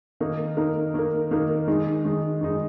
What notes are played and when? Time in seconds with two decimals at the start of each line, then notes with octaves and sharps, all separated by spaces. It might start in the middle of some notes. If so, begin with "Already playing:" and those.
0.21 D#3 A#3 D#4 A#4
0.57 D#3 A#3 D#4 A#4
0.94 D#3 A#3 D#4 A#4
1.31 D#3 A#3 D#4 A#4
1.68 D#3 G#3 D#4
2.04 D#3 G#3 D#4
2.41 D#3 G#3 D#4